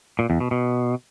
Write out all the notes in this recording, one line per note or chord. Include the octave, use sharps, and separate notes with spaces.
A#2
E2
B2
B2